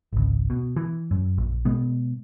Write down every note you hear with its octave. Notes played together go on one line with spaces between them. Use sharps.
G#1 C#2
B2
E3
F#2
A#1
B2 G#3 B3